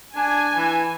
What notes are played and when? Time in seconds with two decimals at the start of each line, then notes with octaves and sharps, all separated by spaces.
0.16 D4 G#5
0.56 E3